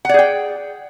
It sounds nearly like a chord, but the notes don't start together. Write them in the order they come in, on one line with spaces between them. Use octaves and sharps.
F#5 D5 G#4 G5